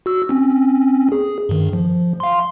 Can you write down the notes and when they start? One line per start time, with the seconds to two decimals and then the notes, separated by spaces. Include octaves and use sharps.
0.06 F#4 E6
0.29 C4 C#4
1.12 G#4
1.49 G2 D#3
1.73 F3
2.20 F5 C6